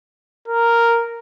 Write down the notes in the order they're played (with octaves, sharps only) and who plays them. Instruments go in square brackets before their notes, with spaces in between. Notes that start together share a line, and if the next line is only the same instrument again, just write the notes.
[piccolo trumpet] A#4